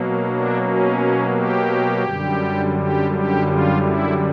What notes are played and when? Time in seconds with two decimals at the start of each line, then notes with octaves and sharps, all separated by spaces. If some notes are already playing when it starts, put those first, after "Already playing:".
Already playing: B2 F#3 A#3
0.26 D4
0.62 C#4
1.33 G4
2.04 F#2 D3 G3
2.76 G4
3.11 G4
3.46 F4
3.82 E4